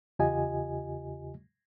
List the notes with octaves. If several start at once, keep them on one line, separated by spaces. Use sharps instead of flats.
E2 C#3 F4 G4 D#5 G#5